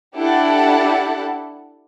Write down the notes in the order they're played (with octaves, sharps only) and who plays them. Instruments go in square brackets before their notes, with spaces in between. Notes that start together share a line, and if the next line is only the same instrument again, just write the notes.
[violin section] D4 E4 G4 A4 F#5